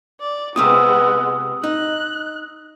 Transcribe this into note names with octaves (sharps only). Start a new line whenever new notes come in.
D5
C3 G#3 B3 C4 F4 D#6 E6
D#4 F#6